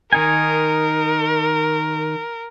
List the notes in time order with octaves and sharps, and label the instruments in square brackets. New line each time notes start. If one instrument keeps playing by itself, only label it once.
[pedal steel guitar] D#3 D#4 G#5 [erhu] A#4